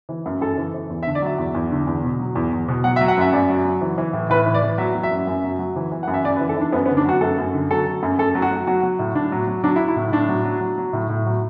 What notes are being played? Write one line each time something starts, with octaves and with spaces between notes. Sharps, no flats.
E3
F#2
F#2 A4
E3
E3
E2
E5
D3
D5
F#3 E5
E2
E2
D3
E2
B2
F#3
E2
E2
B2
F#3 F#5
E5
F#3
F#5
F#2 E5
F#2 D5
F#3
F#3
E3
E3
A2
A2 B4
E3
D5
E3
F#3 E5
F#3
E5
F#2
F#2
F#3
F#3
E3
E3
F#2 F#5
E5
F#2 D5
B4
E3
A4
E3 D4
F#2 B3
B3
D3
D4
F#3 F#4
F#2 A4
F#2
D3
F#3 A4
F#3
F#2
F#2 A4
F#3
F#4
F#3
F#3 F#4
F#3
A2
A2 D4
F#3
F#3
F#3 D4
E4
F#3
E4
A2
A2 D4
F#3
F#3
F#3
F#3
A2
A2
F#3